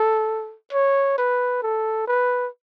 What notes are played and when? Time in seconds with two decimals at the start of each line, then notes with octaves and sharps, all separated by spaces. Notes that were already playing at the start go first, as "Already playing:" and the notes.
Already playing: A4
0.73 C#5
1.18 B4
1.63 A4
2.08 B4